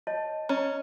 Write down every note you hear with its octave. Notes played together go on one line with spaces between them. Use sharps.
C#5 D#5 A5
C#4 D#5 A#5